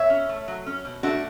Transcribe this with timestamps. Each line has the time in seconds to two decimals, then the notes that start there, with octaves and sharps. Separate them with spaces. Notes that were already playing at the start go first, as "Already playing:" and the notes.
Already playing: B2 C#5 E5
0.10 C#4
0.29 A3
0.48 F#3
0.66 C#4
0.85 B2
1.03 A3 D4 F#4